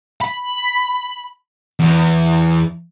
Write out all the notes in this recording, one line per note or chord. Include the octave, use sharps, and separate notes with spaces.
B5
E2